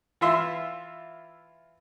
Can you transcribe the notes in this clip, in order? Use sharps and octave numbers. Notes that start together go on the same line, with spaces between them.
E3 F4 E5 C6